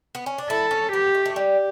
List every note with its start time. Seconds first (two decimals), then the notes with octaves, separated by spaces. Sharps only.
0.15 B3
0.26 C#4
0.38 D4
0.49 E4 A4
0.71 C#4
0.92 B3 G4
1.15 A3
1.25 A3
1.35 G3 G4